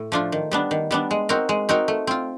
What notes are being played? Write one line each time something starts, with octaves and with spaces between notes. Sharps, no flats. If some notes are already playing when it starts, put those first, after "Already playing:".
Already playing: A2
F3 A3 D4 F4
D#3
G3 B3 D4
D#3
G3 B3 D4
G#3
C4 D#4 F#4 A#4
G#3
C4 D#4 F#4 A#4
A3
C4 F4